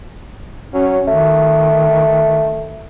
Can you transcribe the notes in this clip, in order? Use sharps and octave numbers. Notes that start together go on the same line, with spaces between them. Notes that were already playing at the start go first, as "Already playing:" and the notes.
F#3 C#4
D#3 A3